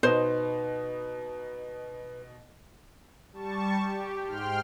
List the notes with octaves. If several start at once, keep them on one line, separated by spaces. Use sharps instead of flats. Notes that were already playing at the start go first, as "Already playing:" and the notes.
B2 D#4 B4 C5
G3 A5 C#6
G4
G#2 G5 C6 F6